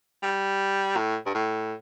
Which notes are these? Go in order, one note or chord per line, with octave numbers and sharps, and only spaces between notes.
G3
A2
G2
A2